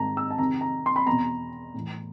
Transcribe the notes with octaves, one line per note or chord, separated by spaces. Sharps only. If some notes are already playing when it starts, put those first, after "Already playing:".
Already playing: G#2 D#3 A5 A#5
E6
A5
F2 C3 D#3 A#5
A#5
C6
B5
E2 A#5
B2
A2 E3